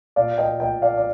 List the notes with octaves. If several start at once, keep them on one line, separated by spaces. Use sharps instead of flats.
A#2 D5 F5
D#5 G5
A#2 D#5 G5
D5 F5
D5